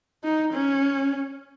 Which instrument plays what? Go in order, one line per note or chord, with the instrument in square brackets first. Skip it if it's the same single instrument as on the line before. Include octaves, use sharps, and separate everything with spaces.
[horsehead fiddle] D#4
C#4